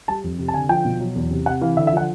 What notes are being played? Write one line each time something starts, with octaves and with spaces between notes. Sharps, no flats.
G3 A5
F2
C3
A5
D3 G#5
F3 G5
B2
F#3
E2
C3
C3 F#5
E3 F5
D3 E5
E5
F3 F#5